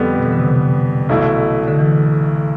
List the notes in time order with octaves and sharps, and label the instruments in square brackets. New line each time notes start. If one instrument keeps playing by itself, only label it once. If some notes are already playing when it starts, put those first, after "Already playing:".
Already playing: [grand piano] F2 D3 G3 B3
[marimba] B2
E3
D3
C3
[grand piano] B1 B2 A3 E4
[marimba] D3
E3